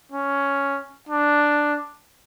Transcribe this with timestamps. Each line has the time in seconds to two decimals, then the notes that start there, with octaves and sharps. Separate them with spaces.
0.12 C#4
1.09 D4